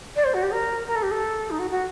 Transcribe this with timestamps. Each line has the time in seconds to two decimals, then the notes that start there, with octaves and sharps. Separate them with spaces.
0.16 D5
0.24 C5
0.34 F#4
0.43 G4
0.52 A#4
0.87 A#4
0.96 A4
1.03 G4
1.11 A4
1.50 D#4
1.59 F#4
1.71 F#4